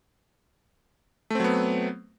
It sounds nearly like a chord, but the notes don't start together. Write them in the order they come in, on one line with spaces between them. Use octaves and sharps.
A3 C4 F#3 B3